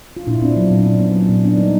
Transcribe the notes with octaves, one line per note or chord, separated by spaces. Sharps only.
F4
A#2 D4 E4
B3 C4 D4
F#3
A#2
D4
A#2 C#4
B3
F#3
A#2
B3 D4
G3 D#4